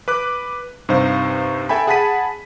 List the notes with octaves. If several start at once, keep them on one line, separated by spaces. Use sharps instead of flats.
B4 D6 F#6
G2 C3 D#4 C5 F5
A4 E5 G5 G#5 B5
G#4 F#5 A5 B5 B6 D#7